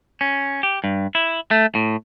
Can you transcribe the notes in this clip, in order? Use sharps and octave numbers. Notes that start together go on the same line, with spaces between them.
C#4
G4
G2
E4
A3
A2